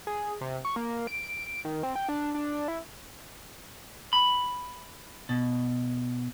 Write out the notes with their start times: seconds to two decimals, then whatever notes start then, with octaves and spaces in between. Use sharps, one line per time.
0.07 G#4
0.41 C3
0.65 C#6
0.76 A#3
1.07 D7
1.65 D#3
1.83 C4
1.95 G5
2.09 D4
2.34 D4
2.68 E4
4.13 B5
5.29 B2